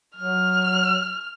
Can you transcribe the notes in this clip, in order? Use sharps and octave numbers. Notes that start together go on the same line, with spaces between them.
F#3 F6